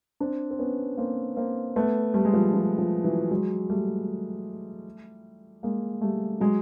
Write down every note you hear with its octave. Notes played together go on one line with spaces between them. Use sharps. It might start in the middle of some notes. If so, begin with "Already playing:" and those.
C4 D4
C4
B3 C#4
A#3 C4
A#3 C4
A3 B3
G3 A3
G#3
F3 G3
F3
F3
E3 F#3
F#3 G#3
G3 A3
G#3 A#3
G3 A3
F#3 G#3